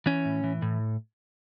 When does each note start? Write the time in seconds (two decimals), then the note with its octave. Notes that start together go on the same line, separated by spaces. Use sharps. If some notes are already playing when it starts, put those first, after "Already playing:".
0.06 E3 C#4
0.25 A2
0.44 E3
0.62 A2